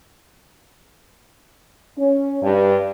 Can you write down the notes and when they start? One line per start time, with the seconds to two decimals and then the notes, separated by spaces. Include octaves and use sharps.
1.97 C#4
2.42 G2